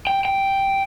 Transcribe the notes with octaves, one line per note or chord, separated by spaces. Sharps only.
G5
G5